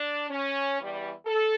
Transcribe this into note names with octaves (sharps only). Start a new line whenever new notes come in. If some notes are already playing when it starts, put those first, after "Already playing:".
Already playing: D4
C#4
E2 E3 G3
A4